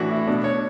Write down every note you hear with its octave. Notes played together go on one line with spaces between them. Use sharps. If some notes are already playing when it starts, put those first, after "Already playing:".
Already playing: A2 E3 D4 F#4
E4
B2 D4
C#5